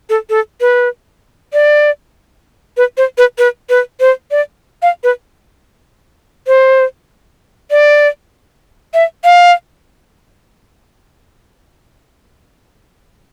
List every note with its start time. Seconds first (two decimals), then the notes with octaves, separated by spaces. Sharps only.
0.10 A4
0.30 A4
0.61 B4
1.53 D5
2.77 B4
2.97 C5
3.18 B4
3.38 B4
3.70 B4
4.00 C5
4.31 D5
4.82 F5
5.04 B4
6.47 C5
7.71 D5
8.94 E5
9.24 F5